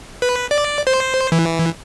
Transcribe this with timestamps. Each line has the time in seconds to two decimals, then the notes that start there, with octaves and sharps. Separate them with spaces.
0.22 B4
0.51 D5
0.87 C5
1.32 E3